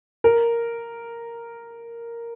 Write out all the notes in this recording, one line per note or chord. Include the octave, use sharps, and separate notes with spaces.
A#4